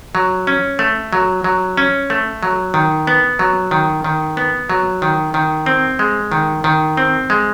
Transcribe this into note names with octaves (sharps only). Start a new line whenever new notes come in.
F#3
C#4
A3
F#3
F#3
C#4
A3
F#3
D#3
B3
F#3
D#3
D#3
B3
F#3
D#3
D#3
C4
G#3
D#3
D#3
C4
G#3